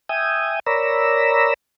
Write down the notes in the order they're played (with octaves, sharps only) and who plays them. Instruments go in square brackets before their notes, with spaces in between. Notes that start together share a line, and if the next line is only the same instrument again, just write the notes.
[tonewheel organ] E5 G5 G#5 D#6
A#4 C#5 D5 A#5 B5 E6